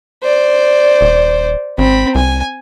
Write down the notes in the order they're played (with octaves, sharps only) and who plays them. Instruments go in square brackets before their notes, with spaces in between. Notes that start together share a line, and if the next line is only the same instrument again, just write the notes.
[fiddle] C5 D5
[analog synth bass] D#1
[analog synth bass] G#1 [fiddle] C4 B5
[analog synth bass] C2 [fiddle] G#5